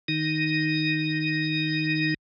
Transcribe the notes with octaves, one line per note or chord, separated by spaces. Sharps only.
D#3 D#4